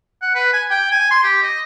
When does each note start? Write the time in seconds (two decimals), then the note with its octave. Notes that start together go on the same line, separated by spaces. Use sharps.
0.22 F#5
0.35 B4
0.53 G#5
0.71 G5
0.91 G#5
1.11 C6
1.23 G4
1.42 D#5